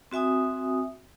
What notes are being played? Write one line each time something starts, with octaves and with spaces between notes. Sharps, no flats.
C4 F#4 E5 G#5 D#6